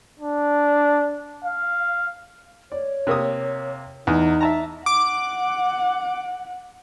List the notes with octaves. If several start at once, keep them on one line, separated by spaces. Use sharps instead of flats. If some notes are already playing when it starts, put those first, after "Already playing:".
D4
F5
C#5 D5
C3 A#3 D#6
E2 D#4
E5 A5 A#5
F#5 D6